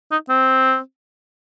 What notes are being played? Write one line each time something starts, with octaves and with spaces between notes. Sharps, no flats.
D#4
C4